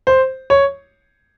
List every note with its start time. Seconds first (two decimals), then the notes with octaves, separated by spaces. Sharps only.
0.07 C5
0.50 C#5